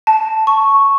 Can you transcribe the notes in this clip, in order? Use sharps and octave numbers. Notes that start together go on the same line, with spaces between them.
A5
C#6